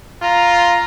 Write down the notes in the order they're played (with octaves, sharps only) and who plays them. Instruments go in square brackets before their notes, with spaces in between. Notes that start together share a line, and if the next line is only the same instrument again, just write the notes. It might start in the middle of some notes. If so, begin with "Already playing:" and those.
[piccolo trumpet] F4 [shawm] A#5